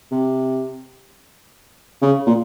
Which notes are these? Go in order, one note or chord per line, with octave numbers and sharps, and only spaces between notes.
C3
C#3
A#2